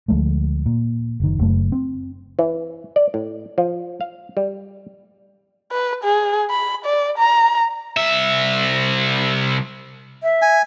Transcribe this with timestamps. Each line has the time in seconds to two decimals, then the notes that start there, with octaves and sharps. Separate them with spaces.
0.08 D2 F3 G#3 A3
0.66 A#2
1.20 F#1 D#3
1.39 F#1 F#2 A3 B3
1.72 C4
2.39 E3
2.96 D5
3.14 A2
3.58 F3
4.01 F5
4.37 G3
5.72 B4
6.04 G#4
6.51 B5
6.85 D5
7.18 A#5
7.97 C2 E5
10.23 E5
10.42 G#5